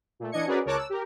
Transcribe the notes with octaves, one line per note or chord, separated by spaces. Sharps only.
A#2 A3
E3 D4 D#5 G#6 C#7
C#4 F#4 G#4 A#4 B4 D5
C#2 A#4 C#5 A5 D6 F#6
E6
G4 A#4